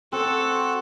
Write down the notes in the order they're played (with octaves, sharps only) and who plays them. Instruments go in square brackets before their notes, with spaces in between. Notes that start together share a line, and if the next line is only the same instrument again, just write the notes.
[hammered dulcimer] C4 [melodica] F#4 F#5 [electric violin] A4